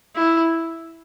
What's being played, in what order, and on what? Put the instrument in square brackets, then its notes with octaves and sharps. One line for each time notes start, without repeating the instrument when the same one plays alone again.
[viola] E4